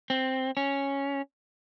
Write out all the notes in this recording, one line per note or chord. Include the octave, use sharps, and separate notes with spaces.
C4
C#4